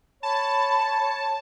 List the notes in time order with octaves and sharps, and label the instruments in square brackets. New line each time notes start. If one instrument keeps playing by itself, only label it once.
[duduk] C#5 [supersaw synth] A5 [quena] B5